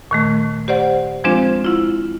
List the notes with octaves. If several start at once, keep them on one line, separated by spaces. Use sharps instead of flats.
A#2 D#3 A3
G4 C5 D5 F#5
F3 G#3 C4 D4 F4 C5
E4 F4